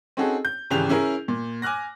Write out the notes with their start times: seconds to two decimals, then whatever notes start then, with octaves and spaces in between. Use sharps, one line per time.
0.17 C4 C#4 D#4 F#4 G#4 A4
0.45 G6
0.70 G#1 C#3 E3 G4 F7
0.89 C#4 E4 G#4 A#4
1.28 A#2
1.62 G#5 D6 F6 F#6 A#6